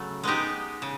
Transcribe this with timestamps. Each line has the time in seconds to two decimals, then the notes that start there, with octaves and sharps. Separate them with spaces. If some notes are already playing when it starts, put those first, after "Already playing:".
Already playing: C#3 F#3 A3
0.23 G#3 B3 D#4 G4
0.82 C#3